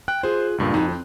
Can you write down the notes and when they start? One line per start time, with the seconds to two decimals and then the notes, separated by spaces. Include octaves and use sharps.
0.08 G5 F#6
0.23 F4 G#4 C5
0.58 C#2 G2 A#2
0.74 F2 D#4 F#4
0.89 C4 C5